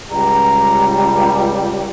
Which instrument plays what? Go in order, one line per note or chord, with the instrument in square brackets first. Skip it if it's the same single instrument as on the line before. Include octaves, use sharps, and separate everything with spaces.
[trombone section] C#2 G3 [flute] A#5